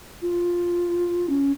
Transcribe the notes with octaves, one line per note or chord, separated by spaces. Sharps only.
F4
C#4